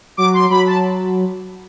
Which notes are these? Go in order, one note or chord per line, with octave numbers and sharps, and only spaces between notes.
F#3 D6
C6
F#3 B5
A5